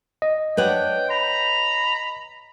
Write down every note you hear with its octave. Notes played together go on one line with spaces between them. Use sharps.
D#5
D4 B4 C#5 F#5 G5
A#5 B5